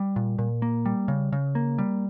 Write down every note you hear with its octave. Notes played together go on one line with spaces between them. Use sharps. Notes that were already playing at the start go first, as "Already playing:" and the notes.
Already playing: G3
A#2
A#2
A#3
G3
C#3
C#3
A#3
G3